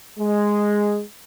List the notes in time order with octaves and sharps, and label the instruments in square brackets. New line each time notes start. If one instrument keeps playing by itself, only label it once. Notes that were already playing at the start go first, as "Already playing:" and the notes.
[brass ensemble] G#3